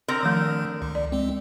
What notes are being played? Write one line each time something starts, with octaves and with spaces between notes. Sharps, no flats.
D3 C4 A#4
D#3 F3 A3
C#2
D5
G#3 C4